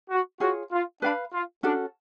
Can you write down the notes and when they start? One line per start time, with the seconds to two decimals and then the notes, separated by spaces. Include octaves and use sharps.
0.10 F#4
0.40 F4 F#4 G#4 C#5
0.71 F4
1.02 D4 B4 F5 B5
1.33 F4
1.63 C#4 D4 F#4 A4